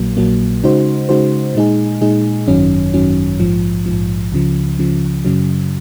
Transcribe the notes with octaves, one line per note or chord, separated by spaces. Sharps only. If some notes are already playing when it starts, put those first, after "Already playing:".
Already playing: A#1 A#2 F#3 A#3
A#1 A#2 F#3 A#3
C#3 G#3 D#4 F#4 C5
C#3 G#3 D#4 F#4 C5
A#2 G#3 D#4 G#4
A#2 G#3 D#4 G#4
G#1 F#2 D#3 F#3 C#4
G#1 F#2 D#3 F#3 C#4
A#1 G#2 F3
A#1 G#2 F3
C#2 C#3 F3
C#2 C#3 F3
F#2 C#3 F#3